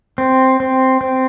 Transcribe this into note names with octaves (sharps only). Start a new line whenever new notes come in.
C4
C4
C4